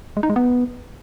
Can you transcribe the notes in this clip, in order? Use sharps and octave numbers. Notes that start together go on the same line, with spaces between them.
G#3
D#4
G#3
B3